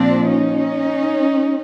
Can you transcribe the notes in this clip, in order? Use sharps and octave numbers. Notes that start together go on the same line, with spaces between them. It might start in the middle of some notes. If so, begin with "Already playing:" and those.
Already playing: A#2 F3 C4 D4
C#4 D#4